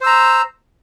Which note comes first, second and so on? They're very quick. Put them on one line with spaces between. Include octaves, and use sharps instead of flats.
C5 E6 A#5